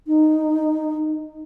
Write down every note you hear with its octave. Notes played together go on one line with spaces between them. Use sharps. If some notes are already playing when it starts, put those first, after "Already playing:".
D#4